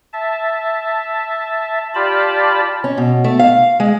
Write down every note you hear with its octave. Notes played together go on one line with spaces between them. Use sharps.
E5 A5
F4 G4 D5 A5 B5
C#4
B2
A3
F5
G#3